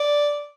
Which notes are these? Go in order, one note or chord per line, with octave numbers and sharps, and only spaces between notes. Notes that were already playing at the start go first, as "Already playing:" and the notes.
Already playing: D5